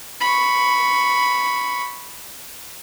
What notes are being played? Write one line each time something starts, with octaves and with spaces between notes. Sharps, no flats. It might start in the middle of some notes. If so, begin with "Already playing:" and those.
B5 C#6